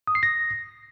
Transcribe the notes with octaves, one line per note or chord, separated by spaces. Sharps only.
D#6
C7
A#6